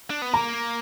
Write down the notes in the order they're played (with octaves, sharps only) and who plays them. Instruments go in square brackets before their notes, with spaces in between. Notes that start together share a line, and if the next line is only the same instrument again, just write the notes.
[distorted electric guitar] D4
B3
[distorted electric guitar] A#3 [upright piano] A#5